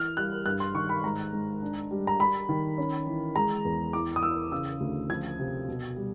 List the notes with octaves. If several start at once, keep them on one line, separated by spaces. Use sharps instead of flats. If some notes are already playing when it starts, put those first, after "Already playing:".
Already playing: E3 F6
G3 F#6
G2 F#6
C6
D#3 C#6
B5
G#2 A#5
G#2
D4
G3
A#5
G3 B5
D#3
C#4
E3
G#3 A#5
E2
E3 D6
D#6
E3 E6
C#3 E6
D2
F3 G#6
C3
B2
G3